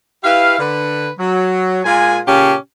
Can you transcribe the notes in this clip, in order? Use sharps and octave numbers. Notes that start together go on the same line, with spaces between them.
E4 G4 B4 F5
D3 B4
F#3
A#2 G#3 A#3 F4 G#5
A#2 C#3 C#4 G4 F5 A5